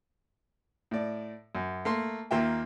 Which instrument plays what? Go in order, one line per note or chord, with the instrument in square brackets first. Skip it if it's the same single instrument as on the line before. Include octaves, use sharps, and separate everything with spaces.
[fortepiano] A2 D5
F#2
A3 A#3 C6
D#2 A#3 F4 E5 G5